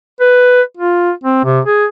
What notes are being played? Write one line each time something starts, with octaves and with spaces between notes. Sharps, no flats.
B4
F4
C4
C3
G#4